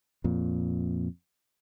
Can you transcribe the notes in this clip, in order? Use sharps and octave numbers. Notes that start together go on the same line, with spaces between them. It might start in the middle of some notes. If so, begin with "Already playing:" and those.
F2 A#2